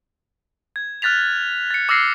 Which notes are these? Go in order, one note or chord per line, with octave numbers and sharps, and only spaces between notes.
G#6
F6 F#6 A6 B6 F7
A6 C#7
D6 E6 F6 A#6 C7 C#7